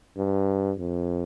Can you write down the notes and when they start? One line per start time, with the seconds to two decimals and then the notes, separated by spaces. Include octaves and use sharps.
0.17 G2
0.79 F2